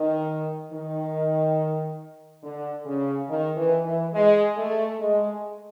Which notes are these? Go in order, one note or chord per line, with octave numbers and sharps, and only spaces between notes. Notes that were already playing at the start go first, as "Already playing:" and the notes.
Already playing: D#3
D#3
D3
C#3
D#3
E3
E3
G#3
A3
G#3